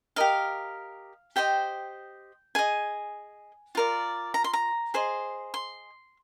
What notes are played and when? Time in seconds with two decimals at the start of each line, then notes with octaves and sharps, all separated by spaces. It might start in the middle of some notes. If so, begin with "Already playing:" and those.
0.16 G4 A#4 D#5 F5
1.36 G4 C5 D#5 G5
2.55 G#4 D#5 G#5
3.75 F4 A#4 D5
4.34 A#5
4.44 C6
4.53 A#5
4.94 G#4 C5 D#5
5.54 C6